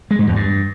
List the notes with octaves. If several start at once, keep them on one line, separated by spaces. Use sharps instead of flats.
G#3
G#2
E2
G2